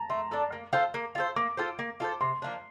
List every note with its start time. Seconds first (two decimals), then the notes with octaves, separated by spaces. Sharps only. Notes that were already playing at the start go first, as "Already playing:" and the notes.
Already playing: A5 A#5
0.10 A3 C6
0.31 D4 A4 D5
0.52 A#3
0.73 F4 A4 C5
0.94 A#3
1.15 F4 A4 C5
1.36 A#3 D6
1.57 F4 A4 C5
1.79 A#3
2.00 F4 A4 C5
2.21 C3 C6
2.42 F3 A#3 D4